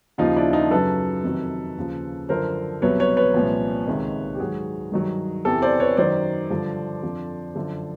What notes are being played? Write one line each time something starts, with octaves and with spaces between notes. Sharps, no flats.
D#2 C#3 F3 D#4 F4
D4 E4
D#4 F4
F#2 C#3 F#3 A4 B4
F2 C3 D#3 F#3
D#2 C#3 F3
F#2 D3 F3 A#4 C5
C2 B2 F#3 B4 C#5
B4 C#5
B4 C#5
C2 A#2 F3
C#2 C3 D#3
G4
G#2 D#3 F#3 F#4 G#4
G2 D#3 F#3
E2 C3 E3 G4 A4
C5 D5
B4 C#5
F#2 D#3 F#3 C5 D5
G2 D3 F3
F2 D3 F3
F#2 D3 F3